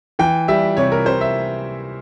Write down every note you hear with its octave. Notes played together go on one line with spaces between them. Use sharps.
E3 G5
G3 E5
C3 C#5
A#4
C3 C5
E5